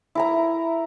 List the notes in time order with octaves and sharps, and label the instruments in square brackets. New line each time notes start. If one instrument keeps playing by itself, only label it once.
[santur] E4 A#4 A#5